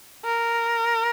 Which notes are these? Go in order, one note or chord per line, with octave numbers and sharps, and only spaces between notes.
A#4